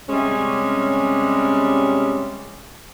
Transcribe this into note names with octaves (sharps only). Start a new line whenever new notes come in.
C3 G3 G#3 C#4